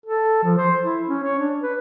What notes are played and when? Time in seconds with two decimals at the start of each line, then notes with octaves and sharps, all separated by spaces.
0.06 A4
0.43 F3
0.58 C5
0.83 E4
1.08 C#4
1.24 C#5
1.38 D4
1.62 B4